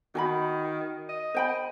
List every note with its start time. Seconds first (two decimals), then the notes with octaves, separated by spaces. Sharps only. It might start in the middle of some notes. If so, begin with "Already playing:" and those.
0.15 D#3 F#4 G#5 B5
1.09 D#5
1.35 C5 G5 B5